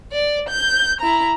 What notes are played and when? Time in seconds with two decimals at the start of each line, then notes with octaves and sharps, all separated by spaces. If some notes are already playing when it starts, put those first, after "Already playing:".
0.12 D5
0.49 G6
1.00 E4 A#5